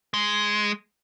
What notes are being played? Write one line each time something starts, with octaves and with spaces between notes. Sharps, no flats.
G#3